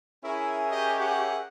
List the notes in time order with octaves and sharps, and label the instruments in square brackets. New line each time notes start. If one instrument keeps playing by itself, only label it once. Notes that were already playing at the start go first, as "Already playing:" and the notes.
[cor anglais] C#4 [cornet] E4 [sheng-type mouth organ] G#4 A#4 E5
[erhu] G4 [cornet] D#5
[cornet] F#5